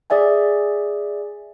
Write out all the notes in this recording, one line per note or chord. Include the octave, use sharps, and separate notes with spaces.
G#4 D5 E5 G#5